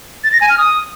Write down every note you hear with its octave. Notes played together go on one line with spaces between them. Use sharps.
A6
A#6
G#5
F6
D#6